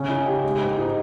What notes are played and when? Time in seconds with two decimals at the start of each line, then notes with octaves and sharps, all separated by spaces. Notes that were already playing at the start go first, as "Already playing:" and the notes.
Already playing: C#3 C#4
0.09 D#4
0.26 G4
0.44 G#3
0.61 G#2
0.77 D#4